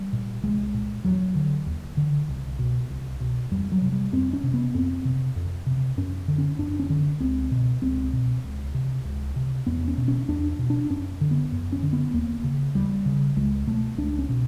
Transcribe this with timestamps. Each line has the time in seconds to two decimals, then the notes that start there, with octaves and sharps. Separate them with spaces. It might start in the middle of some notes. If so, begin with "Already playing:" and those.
Already playing: G3
0.13 A#2
0.43 C2 G#3
0.74 A#2
1.05 D#2 F#3
1.35 D3
1.66 D#2
1.97 D3
2.28 C2
2.59 B2
2.90 C2
3.20 B2
3.51 F2 G3
3.72 F#3
3.82 C3
3.92 G3
4.13 F2 C4
4.33 C#4
4.43 C3
4.54 B3
4.74 F2 C4
5.05 C3
5.36 F2
5.66 C3
5.97 F#2 C#4
6.28 D3
6.38 C#4
6.59 F#2 D4
6.79 C#4
6.90 D3
7.20 C#2 C4
7.52 B2
7.82 C#2 C4
8.13 B2
8.44 C#2
8.74 C3
9.05 C#2
9.36 C3
9.67 E2 B3
9.88 C#4
9.98 B2
10.08 C#4
10.29 E2 D4
10.59 B2
10.70 D4
10.90 F#2 C#4
11.21 D3
11.31 B3
11.52 F#2
11.72 C#4
11.83 D3
11.93 B3
12.13 D#2 A#3
12.44 C#3
12.75 D#2 G3
13.06 C#3
13.37 C#2 G#3
13.67 B2 A3
13.98 C#2 D4
14.19 C#4
14.29 B2